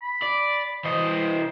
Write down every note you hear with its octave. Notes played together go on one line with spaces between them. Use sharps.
B5
D5
E3 C5 D#5